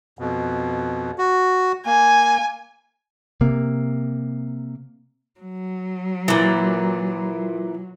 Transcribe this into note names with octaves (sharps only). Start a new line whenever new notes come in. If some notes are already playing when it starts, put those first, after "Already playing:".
F2 B2
F#4
A#3 G#5
C3 A#3
F#3
A#2 E3